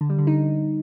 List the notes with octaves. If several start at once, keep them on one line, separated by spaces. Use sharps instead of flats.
D3
G3
D3
D#4